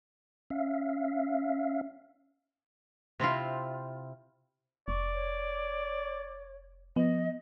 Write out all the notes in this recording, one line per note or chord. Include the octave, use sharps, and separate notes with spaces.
C#4 E5 F5
C3 C4 E4 F4
F1 D5 C#6
C#5
F3 B3 D#5